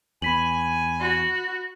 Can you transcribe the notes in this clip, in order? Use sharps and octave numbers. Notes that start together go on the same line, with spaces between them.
E2 G#5 B5 B6 F#7
F#4